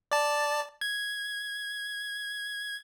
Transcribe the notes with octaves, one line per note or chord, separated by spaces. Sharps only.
D5 A5
G#6